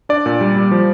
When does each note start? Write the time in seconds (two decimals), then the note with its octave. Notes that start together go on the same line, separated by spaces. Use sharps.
0.09 D4 D5
0.26 A#2
0.41 G3
0.56 G3
0.71 F3